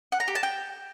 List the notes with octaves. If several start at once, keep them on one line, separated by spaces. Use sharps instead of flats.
F#5
A#5
G4
A5
G5